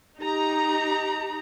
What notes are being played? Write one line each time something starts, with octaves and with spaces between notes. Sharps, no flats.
D#4 G4 A#5